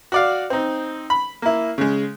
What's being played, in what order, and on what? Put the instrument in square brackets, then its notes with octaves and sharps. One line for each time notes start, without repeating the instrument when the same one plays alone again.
[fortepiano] F#4 D5 F5
C4 D#4
B5
A#3 E4
C#3 G#3